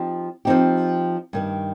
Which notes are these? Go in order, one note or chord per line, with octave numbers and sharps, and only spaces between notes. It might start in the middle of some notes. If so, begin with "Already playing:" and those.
Already playing: F3 C4 D#4 G4
F3 C4 D#4 G4
G2 D#3 G3